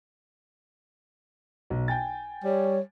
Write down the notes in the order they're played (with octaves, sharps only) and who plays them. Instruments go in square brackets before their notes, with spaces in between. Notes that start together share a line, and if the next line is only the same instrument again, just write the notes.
[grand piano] B1
G5 G#5 A6
[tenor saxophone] G3 [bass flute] C#5